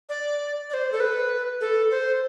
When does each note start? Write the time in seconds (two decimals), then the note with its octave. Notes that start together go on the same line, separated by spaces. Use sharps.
0.09 D5
0.70 D5
0.74 C5
0.92 A4
1.00 B4
1.61 A4
1.91 C5